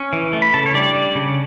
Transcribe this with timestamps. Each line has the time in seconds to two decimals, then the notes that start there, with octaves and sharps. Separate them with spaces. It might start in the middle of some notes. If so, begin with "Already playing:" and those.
Already playing: C#4
0.13 E3
0.33 A3
0.42 B5
0.54 C#3 A4 A5
0.66 C#5
0.74 G3 D4 D5
0.95 G3
1.15 C#3